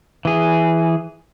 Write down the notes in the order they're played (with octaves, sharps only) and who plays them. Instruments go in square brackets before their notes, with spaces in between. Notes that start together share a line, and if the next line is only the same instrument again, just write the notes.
[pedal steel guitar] E3 G#4